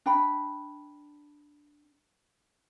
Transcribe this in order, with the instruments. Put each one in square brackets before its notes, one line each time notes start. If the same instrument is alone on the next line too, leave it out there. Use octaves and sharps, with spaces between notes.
[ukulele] D4 G5 B5